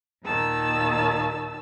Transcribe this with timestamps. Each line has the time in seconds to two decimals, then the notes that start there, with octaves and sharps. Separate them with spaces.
0.23 D#2 A#2 D#3 A5 E6